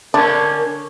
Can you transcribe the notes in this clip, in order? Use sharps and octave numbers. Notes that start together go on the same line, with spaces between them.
D3 C#4 D4 A#4